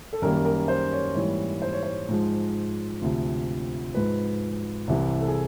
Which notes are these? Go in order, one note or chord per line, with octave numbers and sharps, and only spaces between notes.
A4
F#2 D#3 G3 A#3 A#4
A#4
C5
C#5
G#2 E3 G3 A#3 C#5
C5
C#5
C5
G#2 F3 G#3
D2 C3 F3
G#2 F3 G#3 B4
C2 C3 E3
A4
G#4